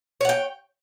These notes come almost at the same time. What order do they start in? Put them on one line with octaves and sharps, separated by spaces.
C#5 F#5 G5